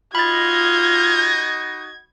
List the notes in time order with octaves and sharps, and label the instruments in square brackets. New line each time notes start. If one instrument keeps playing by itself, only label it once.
[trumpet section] D#4 F#4 D#5 [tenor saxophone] F4 [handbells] B5 A6 [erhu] G#6